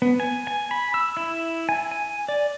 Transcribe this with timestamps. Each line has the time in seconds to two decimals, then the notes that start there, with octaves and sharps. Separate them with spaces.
0.02 B3
0.20 G#5
0.47 G#5
0.71 B5
0.94 E6
1.17 E4
1.69 G#5
1.91 G#5
2.28 D5